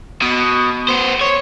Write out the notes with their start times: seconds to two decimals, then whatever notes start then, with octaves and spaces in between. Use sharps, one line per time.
0.22 B2
0.89 B3 C5
1.21 C#5